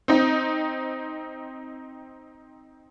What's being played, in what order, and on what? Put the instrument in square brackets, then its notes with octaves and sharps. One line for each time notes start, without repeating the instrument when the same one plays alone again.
[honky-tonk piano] C4 D#4